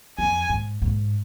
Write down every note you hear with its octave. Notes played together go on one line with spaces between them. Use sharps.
F2 G#5
G#2
G#2